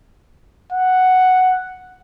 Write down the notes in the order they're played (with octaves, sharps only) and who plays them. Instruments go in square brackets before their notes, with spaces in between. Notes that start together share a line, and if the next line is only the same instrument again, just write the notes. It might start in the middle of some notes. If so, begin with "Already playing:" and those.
[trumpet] F#5